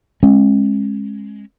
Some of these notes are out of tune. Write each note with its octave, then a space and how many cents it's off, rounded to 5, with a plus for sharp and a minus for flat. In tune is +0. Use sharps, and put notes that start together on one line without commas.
G#3 +0 C#4 -35